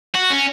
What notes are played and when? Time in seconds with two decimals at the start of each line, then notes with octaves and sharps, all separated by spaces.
0.15 F#4
0.30 C#4